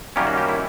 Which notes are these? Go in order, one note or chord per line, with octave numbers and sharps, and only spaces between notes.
F#2 D#3 G3 A#3 C#4 G4
F#4
G4
E4